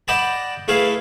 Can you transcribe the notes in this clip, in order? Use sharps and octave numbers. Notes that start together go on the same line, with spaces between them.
D5 D#5 F#5 G5 A5 B5
A3 E4 G#4 B4 F5